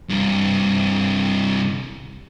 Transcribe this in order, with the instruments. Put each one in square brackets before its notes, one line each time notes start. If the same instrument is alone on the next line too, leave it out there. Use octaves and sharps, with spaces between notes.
[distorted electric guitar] C2 G2